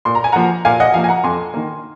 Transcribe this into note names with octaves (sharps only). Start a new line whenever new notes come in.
A#2 C6
A#5
G#5
F3 A#3 F#5 A#5
A#2 F5 G#5
D#5 F#5
F3 A#3 F5 G#5
G#5
F#5 A#5
F2 G#5 C6
D#3 A#3